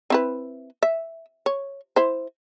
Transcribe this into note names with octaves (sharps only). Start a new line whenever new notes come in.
C4 E4 B4
E5
C#5
E4 C5